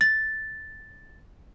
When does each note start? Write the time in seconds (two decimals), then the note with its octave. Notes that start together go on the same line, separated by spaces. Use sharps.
0.01 A6